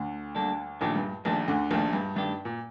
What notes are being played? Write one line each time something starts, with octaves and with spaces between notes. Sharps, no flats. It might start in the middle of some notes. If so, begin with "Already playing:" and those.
Already playing: D2 D3
G3 A#3 D4 A4
A#1 A#2 D#3 A3 D4 G4
G2
A#1 A#2 D#3 A3 D4 G4
D2 D3
A#1 A#2 D#3 A3 D4 G4
G2
G2 D#3 A3 D4 G4
A#2